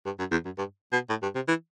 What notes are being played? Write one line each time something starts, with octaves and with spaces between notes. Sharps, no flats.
G2
F#2
E2
F#2
G2
B2
A2
G2
C3
E3